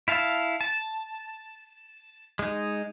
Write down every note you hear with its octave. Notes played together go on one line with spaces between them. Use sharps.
E4 F5 A5
A5
G#3 D#4